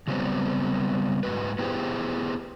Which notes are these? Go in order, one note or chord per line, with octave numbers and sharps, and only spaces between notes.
C#3 F#3 G3 B3 C4
G#2 D#3 F#4 B4
B3 E4 G4 G#4 C5